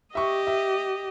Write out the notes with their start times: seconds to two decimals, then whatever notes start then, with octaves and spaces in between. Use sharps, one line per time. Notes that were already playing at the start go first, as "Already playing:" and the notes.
0.15 G4 D#5 E5 C#6
0.47 E5